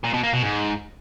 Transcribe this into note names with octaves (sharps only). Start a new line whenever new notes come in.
A#2
B2
A#3
B2
G#2